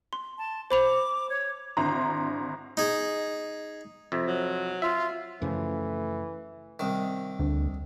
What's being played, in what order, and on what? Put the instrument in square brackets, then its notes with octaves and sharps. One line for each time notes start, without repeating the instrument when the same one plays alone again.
[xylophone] C6
[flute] A5
[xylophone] C5 B5 F7 [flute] D6
[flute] C#5
[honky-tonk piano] G#1 D3 E4 A#5 C6
[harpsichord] D#4 G#4
[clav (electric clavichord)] F2 C3
[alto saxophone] F#3
[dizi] F4 [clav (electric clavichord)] E5
[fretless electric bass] F#2 C#3 F3 [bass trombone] E3 [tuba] A3
[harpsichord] C2 D#3
[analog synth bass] D2